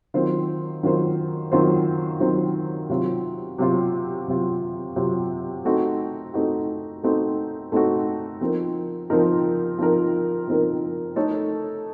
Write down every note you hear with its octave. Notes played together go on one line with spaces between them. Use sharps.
D#3 F#3 C4 F4 C5
D#3 F#3 C4 F4 C5
D#3 F#3 C4 F4 C5
D#3 F#3 C4 F4 C5
C3 F#3 C4 F4
C3 F#3 C4 F4
C3 F#3 C4 F4
C3 F#3 C4 F4
A3 C4 D#4 F#4
A3 C4 D#4 F#4
A3 C4 D#4 F#4
A3 C4 D#4 F#4
F3 C4 D#4 A#4
F3 C4 D#4 A#4
F3 C4 D#4 A#4
F3 C4 D#4 A#4
A3 D#4 A4 C#5